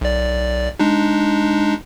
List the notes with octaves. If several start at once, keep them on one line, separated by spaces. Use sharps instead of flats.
B1 D5
G#3 D4 D#4